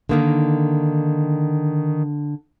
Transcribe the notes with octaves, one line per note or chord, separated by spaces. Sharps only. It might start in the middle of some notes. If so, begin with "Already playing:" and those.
D3 D#3 A#3 D#4